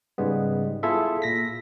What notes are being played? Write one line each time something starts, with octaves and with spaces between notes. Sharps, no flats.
G#2 C#3 G3 G#3 B3
B3 E4 F4 G#4 A4 E5
A#2 A#6 B6